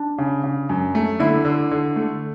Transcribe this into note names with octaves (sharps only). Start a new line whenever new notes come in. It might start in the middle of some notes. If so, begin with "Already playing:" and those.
Already playing: D4
C#3
C#3
F#2
A3
D3 E4
D3
D3
A3